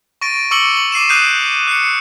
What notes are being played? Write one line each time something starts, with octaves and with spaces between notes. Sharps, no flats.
C#6 A6 A#6 D7 D#7
C#6 D6 E6 C#7 F#7 G7
F#7
D6 C7 D#7 E7
D#6 F#6 G6 C7 D7 D#7
F#6 C7 C#7